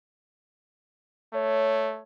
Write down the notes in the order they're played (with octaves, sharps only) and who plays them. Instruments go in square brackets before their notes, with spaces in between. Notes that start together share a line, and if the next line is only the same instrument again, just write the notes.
[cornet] A3 [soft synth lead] C#5